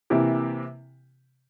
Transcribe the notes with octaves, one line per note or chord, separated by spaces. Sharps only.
C3 E3 A#3 E4 G4